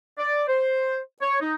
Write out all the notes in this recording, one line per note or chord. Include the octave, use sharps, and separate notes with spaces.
D5
C5
C#5
D#4